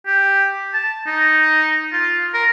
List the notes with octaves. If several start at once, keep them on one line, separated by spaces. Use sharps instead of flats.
G4
A5
D#4
F4
A#4